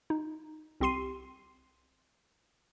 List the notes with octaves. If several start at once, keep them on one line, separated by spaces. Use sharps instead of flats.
D#4
C2 C4 G4 C6 C7 D#7